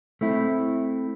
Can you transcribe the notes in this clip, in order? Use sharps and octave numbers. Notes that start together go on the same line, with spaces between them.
A3 C4 E4